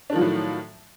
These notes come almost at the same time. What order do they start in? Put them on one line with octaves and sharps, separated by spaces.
D4 D#3 F3 F#3 A2